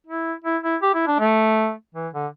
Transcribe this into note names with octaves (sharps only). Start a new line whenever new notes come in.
E4
E4
E4
G4
E4
D4
A3
E3
D3